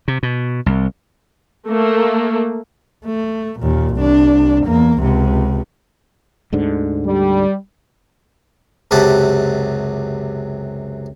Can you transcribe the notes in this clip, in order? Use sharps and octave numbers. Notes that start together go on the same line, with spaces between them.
C3
B2
C2
A3 A#3
A3
D#2 A#2
C2 D4
E2 A#3
C#2 C3
D2 G#2 D3
G3
C#2 F#2 C3 G4 F#5 A5